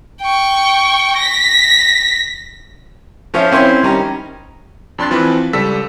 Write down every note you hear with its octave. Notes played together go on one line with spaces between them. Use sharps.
G5 C#6
A#6 B6
F3 C#4 F4 C5 C#5 E5
C4 C#4 E4 C5 C#5
D#3 G3 C#4 A#5
F2 D4 C6 F#6 A6
E3 F3 C4 B4
C#2 G3 A4 E6 B6